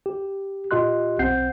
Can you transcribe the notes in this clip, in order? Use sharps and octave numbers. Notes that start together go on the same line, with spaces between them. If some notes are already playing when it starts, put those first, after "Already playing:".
G4
A#2 F4 G4 D#5 C6 F#6
B1 C4 F#5 G6 C7